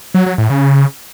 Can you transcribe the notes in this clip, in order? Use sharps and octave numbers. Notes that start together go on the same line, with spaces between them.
F#3
F#3
A2
C#3